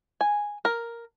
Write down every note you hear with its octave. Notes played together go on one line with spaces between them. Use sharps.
G#5
A#4